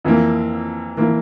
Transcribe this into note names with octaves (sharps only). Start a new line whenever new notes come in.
F2 E3 A#3
E3 A#3